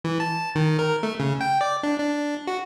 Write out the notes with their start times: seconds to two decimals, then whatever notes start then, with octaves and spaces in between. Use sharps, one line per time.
0.04 E3
0.20 A5
0.55 D#3
0.79 A#4
1.03 A3
1.20 C#3
1.41 G5
1.61 D5
1.83 D4
2.00 D4
2.47 F#4